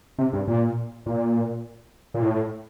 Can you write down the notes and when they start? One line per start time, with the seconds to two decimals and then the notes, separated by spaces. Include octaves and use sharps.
0.18 C3
0.33 G2
0.48 A#2
1.06 A#2
2.14 A#2
2.22 A2